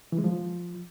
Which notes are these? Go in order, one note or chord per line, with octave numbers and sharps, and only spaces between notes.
E3
G#3
F3